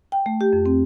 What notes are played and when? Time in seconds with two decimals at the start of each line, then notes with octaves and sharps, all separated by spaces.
0.12 G5
0.26 A3
0.41 G4
0.53 F2
0.66 C4